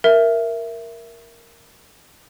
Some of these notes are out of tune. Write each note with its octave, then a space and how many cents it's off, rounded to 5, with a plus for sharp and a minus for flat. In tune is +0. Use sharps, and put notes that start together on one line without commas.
A#4 +0 E5 +10